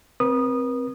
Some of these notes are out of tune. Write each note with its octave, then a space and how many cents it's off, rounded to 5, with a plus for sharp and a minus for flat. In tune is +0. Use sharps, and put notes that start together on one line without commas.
C4 +0 B4 -45 D#6 -20